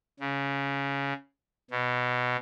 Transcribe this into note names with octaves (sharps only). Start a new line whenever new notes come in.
C#3
B2